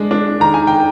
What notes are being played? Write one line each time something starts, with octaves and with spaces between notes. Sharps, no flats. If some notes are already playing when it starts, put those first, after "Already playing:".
Already playing: G#3 D4
D4
D#3 A#5
G#5
G5